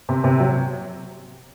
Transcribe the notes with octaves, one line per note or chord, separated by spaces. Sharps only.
C3
C3
F#3